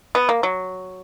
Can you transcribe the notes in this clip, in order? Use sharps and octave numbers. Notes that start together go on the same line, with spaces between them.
B3
A#3
F#3